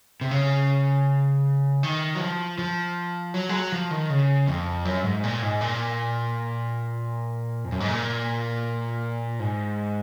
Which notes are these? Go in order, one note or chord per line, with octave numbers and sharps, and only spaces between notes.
C3
C#3
D#3
F#3
F3
F3
F#3
G#3
F#3
F3
D#3
C#3
F2
F#2
G#2
A#2
G#2
A#2
F2
F#2
G#2
A#2
G#2